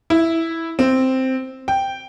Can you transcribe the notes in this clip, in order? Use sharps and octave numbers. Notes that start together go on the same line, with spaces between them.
E4
C4
G5